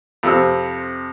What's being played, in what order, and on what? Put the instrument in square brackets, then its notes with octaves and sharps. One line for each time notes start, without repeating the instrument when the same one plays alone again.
[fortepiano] F2 C3 E6